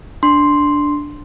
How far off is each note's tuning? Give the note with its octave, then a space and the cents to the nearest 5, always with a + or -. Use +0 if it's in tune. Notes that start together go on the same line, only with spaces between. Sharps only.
D4 +0 C6 +0